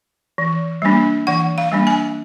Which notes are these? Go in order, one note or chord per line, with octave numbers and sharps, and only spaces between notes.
E3
G3 A#3 D4
E3 F#5
F5
G3 A#3 D4
G#5